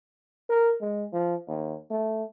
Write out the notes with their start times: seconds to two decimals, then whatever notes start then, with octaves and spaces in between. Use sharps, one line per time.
0.50 A#4
0.81 G#3
1.13 F3
1.48 D#2
1.91 A3